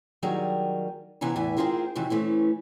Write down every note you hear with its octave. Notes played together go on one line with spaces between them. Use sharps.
D#3 F#3 G3 G#4 A#4
C3 E3 B3 G#5 A#5
E2 A2 E3 E5 G#5
C4 D4 F4 G#4 A#4 C5
F2 C3 D#3 E3 F#3
E3 A3 C4 C#4